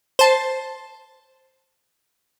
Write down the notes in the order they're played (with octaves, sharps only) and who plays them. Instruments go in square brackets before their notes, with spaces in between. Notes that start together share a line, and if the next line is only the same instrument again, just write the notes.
[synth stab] C5 A5